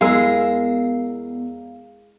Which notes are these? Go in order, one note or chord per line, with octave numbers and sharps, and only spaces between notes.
E2 G#3 E4 A#4 F5 E6